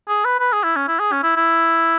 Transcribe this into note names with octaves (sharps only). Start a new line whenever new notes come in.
G#4
B4
B4
G#4
E4
C#4
E4
G#4
C#4
E4
E4